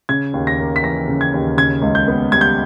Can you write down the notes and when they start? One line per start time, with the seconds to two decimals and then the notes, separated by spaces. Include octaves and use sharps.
0.09 C#3 G#6
0.34 D#2
0.47 A#6
0.59 A#3
0.76 B6
0.83 E3 A#6
1.08 C#3
1.21 G#6
1.34 D#2
1.58 C#3 G#6
1.82 C#2
1.95 G6
2.08 B3
2.32 G3 G#6
2.41 G6